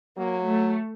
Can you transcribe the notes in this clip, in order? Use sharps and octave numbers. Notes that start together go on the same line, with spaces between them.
F#3 A#3
A3